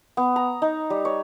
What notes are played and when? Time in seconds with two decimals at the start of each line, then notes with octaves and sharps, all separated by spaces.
0.17 B3
0.36 A#5
0.62 D#4
0.90 G3
1.05 C#5